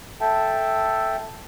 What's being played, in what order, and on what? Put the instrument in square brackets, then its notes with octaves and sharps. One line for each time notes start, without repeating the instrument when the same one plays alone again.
[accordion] A4 E5 G5 A5